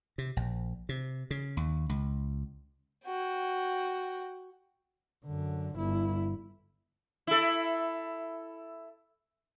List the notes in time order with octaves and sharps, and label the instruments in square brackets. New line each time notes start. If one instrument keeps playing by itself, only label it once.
[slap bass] C3
A#1
C3
C#3
D#2
C#2
[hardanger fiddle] F#4 G5
[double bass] F#2 D3
G1 E4
[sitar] E4 A4